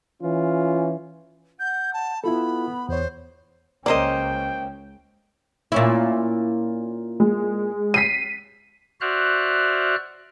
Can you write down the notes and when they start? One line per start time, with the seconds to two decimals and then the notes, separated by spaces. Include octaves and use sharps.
0.22 E3 C#4 F4
1.60 F#5 G6
1.94 A5
2.24 B3 E4 F4 A4 B5
2.89 E2 C5 C#5
3.86 C#2 A#3 C#4 A#4 C5 D5 D#5 G5
5.72 A#2 C#4 E4
7.20 G#3
7.94 B6 C7 D#7
9.01 F#4 C5 D5 E5 F6 F#6